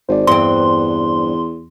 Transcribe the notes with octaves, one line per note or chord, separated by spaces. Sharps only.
G#1 C5 D5
E2 G2 C4 C6